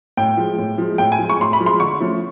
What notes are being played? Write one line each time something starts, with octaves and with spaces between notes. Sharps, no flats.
A2 G5
F3 G#3
A2
F3 G#3
A2 G5
G#5
F3 G#3
C#6
A2 C6
B5
F3 G#3
C6
D3 C#6
F3 A3 C#4